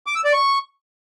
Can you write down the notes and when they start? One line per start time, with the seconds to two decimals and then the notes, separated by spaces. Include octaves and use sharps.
0.07 D6
0.15 E6
0.24 D5
0.33 C#6